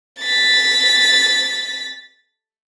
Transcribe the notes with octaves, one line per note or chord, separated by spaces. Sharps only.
A6 B6